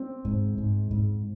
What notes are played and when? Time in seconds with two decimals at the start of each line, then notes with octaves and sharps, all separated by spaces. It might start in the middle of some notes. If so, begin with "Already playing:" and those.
Already playing: C4
0.25 G#2
0.58 G#2
0.91 G#2